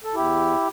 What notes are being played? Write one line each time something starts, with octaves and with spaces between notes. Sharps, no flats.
A4
E2 E4 G4